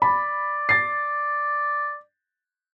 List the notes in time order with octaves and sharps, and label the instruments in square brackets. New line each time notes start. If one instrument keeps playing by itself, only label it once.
[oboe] D5 [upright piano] B5
[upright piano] A6 C7